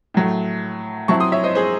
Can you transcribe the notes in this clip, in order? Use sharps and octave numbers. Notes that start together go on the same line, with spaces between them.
A2 F#3 A3
F#3 C4 E4 A5 C#6
C6 D#6
C#5 E5
C5 D#5
G#4 C5